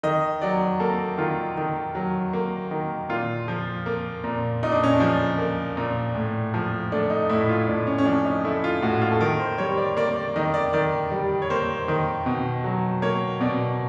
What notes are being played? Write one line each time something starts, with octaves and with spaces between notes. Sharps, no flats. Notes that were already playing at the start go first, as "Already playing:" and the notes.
D#3 D#5
F#3 D5
A#3 A4
D#3 F4
D#3
F#3
A#3
D#3
A#2 F4
F3
A#3
A#2
A#2 D#4
D4
C#4
D4
F3
A#3
A#2
A2
F3
A3 D4
D#4
A2 E4
F4
A2 D4
C#4
C#4
F3 D4
D#4
A3 E4
F4
A2 F#4
F4
A4
D#3 A#4
C5
G3 C#5
D5
A#3 D5
D5
D#3 D#5
D5
D#3 D5
G3
C#5
A#3 C5
D#3
B2
F#3
A#3 C#5
B2 D5